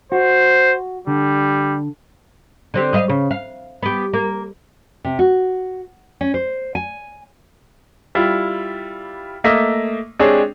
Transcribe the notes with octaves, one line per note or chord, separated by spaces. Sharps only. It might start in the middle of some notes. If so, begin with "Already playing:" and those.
F#4 C5
D3 G3
D3 C4 G4
G3 D#5 F5
C#3
F5
B3 G4
A#3
C3
F#4
C#4
C5
G#5
G3 E4 F4
A3 A#3 D#5 E5
G#3 C4 D4 G4 G#4 C#5